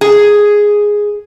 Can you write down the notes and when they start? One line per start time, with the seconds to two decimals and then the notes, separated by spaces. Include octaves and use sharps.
0.01 G#4